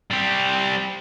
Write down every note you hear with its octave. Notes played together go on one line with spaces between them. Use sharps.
G3 C4